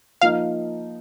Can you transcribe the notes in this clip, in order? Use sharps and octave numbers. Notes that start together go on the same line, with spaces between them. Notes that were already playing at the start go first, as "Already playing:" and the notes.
F3 A#3 D#4 F5